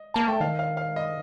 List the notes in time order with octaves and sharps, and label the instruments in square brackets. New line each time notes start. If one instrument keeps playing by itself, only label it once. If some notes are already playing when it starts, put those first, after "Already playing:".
Already playing: [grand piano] D#5
[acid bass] A#3 [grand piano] A5
[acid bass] A3 [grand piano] G5
[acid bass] D#3 [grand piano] F5
[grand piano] F5
F5
D#5